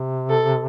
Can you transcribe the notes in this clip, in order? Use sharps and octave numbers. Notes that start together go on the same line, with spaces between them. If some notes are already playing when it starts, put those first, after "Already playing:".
Already playing: C3
A4